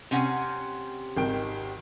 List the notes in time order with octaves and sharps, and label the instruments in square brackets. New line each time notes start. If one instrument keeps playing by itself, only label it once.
[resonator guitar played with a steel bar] C3 C#4 F#5
[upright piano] G#1 D#3 G5